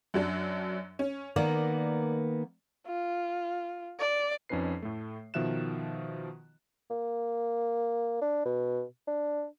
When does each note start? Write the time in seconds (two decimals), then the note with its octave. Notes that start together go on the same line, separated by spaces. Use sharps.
0.14 F#2 F#3 D4
0.99 C#4
1.36 D#3 A#3 B3 D5
2.87 F4
3.99 D5
4.49 F2 F3 C#4 D#4 B4 C7
4.82 A2 A3
5.34 B2 D#3 F3 E5 F#6 E7
6.91 A#3
8.22 D4
8.45 B2
9.07 D4